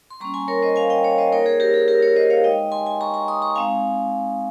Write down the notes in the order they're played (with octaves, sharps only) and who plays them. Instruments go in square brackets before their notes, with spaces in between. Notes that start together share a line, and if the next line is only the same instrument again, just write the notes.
[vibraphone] C6
G3 A#3 C#4 A#5 C#6
G#5 C6
A#4 C#5
C5 D#5
F5 G#5
D#5 G5
C#5 F5
C5 D#5
A#3 D#4 A#4 C#5
G#4 C5
G4 A#4
G#4
G4 A#4
A#4 C#5
C5 D#5
C#5 F5
G#3 D#4 D#5 G5
G#5 C6
G#5 C6
A#5 C#6
A#5 C#6
C6 D#6
A#5 C#6
G#3 C4 D#4 F5 G#5